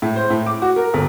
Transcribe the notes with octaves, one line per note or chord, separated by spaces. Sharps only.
A2
C5
A2
D6
F#4
A#4
G1